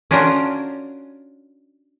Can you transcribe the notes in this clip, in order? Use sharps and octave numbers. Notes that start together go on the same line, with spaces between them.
C#4 D4 F4 F#4 A#4 C5